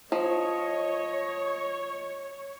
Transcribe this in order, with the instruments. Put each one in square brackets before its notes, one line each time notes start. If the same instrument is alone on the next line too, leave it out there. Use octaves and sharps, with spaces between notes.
[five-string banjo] F3 [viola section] C#5 [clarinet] D#5